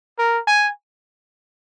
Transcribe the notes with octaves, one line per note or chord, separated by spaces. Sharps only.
A#4
G#5